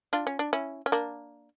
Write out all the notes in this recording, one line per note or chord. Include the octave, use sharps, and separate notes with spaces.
D4 F4
C#4
D4
C#4 E4
C#4
A#3 D4